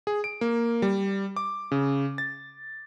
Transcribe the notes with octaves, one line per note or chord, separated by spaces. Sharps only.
G#4
D7
A#3
G3
D6
C#3
A6